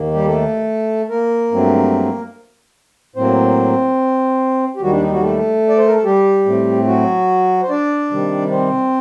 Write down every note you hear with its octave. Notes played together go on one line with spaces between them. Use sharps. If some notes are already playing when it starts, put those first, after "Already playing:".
Already playing: D#2 D#3 A#3
G3 G4
A3 A4
A#3 A#4
G2 F#3 A3 C4
A2 F#3 A#3 C4 C5
G4
D#2 D#3 F#3 G3 F#4
D4
D#4
F#3 F#4
A3 A4
D5
C5
A#4
A4
G3 G4
A2 A3 C4
F#3 F#4
C5
D4 D5
C3 D#3 G3
C4 C5